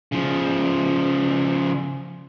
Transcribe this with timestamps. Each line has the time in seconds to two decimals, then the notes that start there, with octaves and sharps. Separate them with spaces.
0.12 C#3 F3